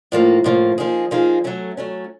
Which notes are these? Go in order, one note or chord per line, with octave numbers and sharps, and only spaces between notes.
A2 F3 A#3
A2 F3 A#3
F3 A#3 D#4 G#4
F3 A#3 D#4 G#4
F#3 A3 C#4
F#3 A3 C#4